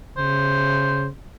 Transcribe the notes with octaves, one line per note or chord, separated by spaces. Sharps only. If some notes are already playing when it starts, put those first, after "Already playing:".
C#3 C5